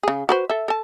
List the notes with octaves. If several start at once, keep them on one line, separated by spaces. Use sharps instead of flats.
C#3 G#4
F#4 B4 C5
A4 E5
A4 A5